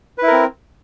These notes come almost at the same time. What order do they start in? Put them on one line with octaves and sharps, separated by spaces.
B4 E4 A#4 C4